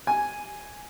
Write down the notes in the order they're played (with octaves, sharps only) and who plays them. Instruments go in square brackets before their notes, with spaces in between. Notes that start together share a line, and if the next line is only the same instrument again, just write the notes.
[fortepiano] G#5